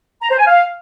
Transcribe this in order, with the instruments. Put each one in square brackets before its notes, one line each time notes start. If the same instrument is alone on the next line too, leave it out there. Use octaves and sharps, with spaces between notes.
[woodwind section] A#5
C5
G#5
F5